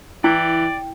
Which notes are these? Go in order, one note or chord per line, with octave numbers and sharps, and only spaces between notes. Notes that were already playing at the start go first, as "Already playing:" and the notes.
E3 E4 D5 G5